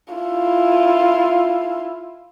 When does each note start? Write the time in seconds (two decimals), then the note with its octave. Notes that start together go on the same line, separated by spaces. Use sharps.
0.14 E4 F4